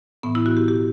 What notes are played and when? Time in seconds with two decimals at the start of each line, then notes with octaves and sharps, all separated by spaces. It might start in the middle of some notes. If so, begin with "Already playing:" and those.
0.23 A2 E3 B3
0.35 E4
0.46 F#4
0.57 G4
0.68 B2 G4